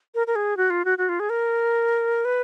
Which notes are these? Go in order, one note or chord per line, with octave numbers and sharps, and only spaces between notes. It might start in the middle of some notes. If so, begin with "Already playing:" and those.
A#4
A#4
G#4
F#4
F4
F#4
F#4
F4
G#4
A#4
B4